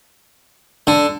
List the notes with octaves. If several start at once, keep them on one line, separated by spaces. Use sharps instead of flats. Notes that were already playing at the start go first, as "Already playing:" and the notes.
D3